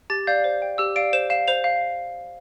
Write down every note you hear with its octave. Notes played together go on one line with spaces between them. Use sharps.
G4 A6
D5 F5 G6
C5
G5
G4 E6
D5 F5 D7
C5 E7
F5 E7
C5 F7
F5